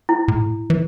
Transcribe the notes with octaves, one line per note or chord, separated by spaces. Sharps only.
E4
A2
E3